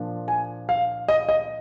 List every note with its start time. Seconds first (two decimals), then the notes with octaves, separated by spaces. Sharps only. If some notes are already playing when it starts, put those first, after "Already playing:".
Already playing: A#2 F3 A#3 D4
0.28 G#5
0.69 F5
1.08 D#5
1.29 D#5